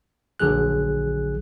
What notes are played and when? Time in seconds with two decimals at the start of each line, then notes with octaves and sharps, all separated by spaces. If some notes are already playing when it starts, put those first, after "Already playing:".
0.40 A#1 D3 F#3 G#4 F#6